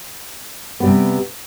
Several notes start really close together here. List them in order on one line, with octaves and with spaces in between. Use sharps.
B3 G3 C3